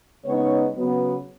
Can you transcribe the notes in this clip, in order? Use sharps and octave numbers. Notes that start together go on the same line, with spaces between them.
C#3 G#3 B3 D#4 C#5
C#3 F#3 B3